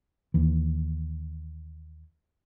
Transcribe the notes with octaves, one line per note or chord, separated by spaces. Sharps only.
D#2 E3